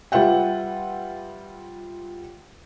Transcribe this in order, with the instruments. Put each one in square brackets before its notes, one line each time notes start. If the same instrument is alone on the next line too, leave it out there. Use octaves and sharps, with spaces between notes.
[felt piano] G3 F4 B4 E5 F#5 G5